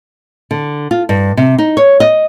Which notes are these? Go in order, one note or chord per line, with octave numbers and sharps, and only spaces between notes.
D3
F4
G2
C3
D#4
C#5
D#5